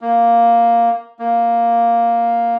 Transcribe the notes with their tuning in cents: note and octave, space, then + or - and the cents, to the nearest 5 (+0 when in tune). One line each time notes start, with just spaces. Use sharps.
A#3 +0
A#3 +0